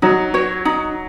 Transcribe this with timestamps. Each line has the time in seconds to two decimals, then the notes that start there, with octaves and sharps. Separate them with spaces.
0.02 F#3 D#4
0.34 F#4 C#5
0.65 D#4